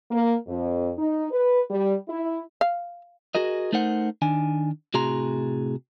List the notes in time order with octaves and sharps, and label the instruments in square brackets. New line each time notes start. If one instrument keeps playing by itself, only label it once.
[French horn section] A#3
F2
D#4
B4
G3
E4
[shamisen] F5
[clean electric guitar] F#4 G#4 A#4 D#5
A3 D#4 A#4 C5 F#5
D#3 D4 G#5
A2 C3 F#4 G#4 A#5 C6